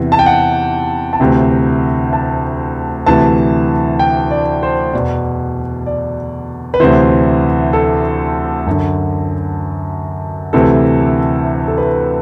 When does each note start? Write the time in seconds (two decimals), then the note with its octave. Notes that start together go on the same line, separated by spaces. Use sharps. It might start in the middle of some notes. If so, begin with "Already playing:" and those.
Already playing: E2 C3 E3
0.12 A5
0.19 G5
0.26 F#5
1.13 A5
1.19 D2 C3 E3 G5
2.13 A5
3.06 D2 C3 E3 A5
3.99 G5
4.31 D5
4.63 C5
4.93 E2 B2 D5
5.86 D5
6.74 B4
6.80 D2 C3 E3 C5
7.73 A4
8.66 F#2 D3
10.53 D2 C3 E3 A4
11.68 A4
11.78 B4